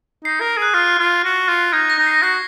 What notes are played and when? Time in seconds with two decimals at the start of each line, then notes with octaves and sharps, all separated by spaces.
0.25 D#4 C7
0.41 A#4
0.57 G#4 F#6
0.74 F4 F6
0.98 F4
1.24 F#4
1.49 F4
1.73 D#4 G#6
1.90 A#6
1.98 D#4
2.07 C7
2.22 F#4 C7